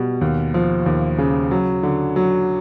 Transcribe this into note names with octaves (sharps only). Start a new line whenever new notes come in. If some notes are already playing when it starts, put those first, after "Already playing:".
Already playing: B2 G3
D#2
F3
D#2
C#3
F#3
D3
F#3